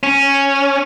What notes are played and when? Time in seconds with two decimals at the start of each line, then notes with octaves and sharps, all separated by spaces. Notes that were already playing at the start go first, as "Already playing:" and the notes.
0.03 C#4